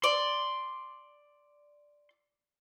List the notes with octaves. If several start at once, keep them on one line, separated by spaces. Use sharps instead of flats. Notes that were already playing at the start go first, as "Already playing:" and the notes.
D5 C6